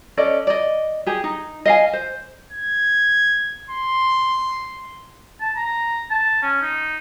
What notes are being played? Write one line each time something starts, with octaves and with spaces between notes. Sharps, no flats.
C#4 A4 D5 D#5
D5 D#5
G4 G#4
D#4
D#5 F5 G#5
C5
G#6
C6
A5
A#5
A5
C#4
D#4